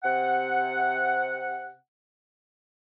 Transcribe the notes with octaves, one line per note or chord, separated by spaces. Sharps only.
C3 F#5